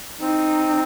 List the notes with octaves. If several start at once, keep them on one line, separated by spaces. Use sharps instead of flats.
C4 D#4